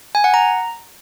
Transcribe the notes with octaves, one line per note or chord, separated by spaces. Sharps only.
G#5
F#5
A#5